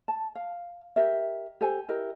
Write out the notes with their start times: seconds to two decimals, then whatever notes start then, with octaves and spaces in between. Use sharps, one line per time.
0.08 A5
0.35 F5
0.96 G4 A#4 D#5 E5
1.61 G4 A4 C5 G#5
1.89 E4 G4 A#4 D#5